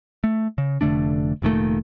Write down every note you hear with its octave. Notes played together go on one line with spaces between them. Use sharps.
A3
C#3
F1 D3 A3 D4
F1 A#2 D#3 A3